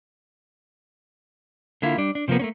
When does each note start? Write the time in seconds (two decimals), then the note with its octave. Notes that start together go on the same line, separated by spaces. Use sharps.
1.82 D3 A#3 E4 F4
1.97 G3 D4
2.15 D4
2.28 C3 F3 G#3 A#3 B3
2.39 A3 A#3 C#4